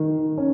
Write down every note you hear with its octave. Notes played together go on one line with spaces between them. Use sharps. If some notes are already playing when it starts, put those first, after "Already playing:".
Already playing: D#3
C#4